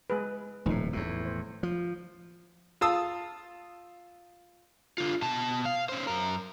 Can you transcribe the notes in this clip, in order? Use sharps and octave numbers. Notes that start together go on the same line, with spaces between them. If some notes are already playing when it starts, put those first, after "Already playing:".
G#3 G#4 B4
D#1 A2 F3 A3 D#4
E2 A2
C5
F3
F4 F5 A5 D#6 E6
D3 F4
B2 A5
F5
C#4 C5
F#2 A#4